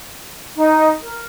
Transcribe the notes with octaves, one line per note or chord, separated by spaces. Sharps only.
D#4
A#4